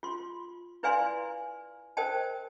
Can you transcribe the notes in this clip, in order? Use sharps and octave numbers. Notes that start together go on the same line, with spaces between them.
F4 C6
E4 B4 D5 F5 G#5 C6
A#4 C5 D#5 G5 A5